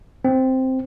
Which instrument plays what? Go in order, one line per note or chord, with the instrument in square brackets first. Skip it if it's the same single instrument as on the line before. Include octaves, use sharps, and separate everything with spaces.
[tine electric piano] C4